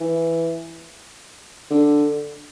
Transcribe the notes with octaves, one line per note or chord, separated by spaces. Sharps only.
E3
D3